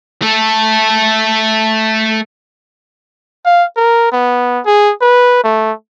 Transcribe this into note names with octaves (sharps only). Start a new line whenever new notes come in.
A3 A4
F5
A#4
B3
G#4
B4
A3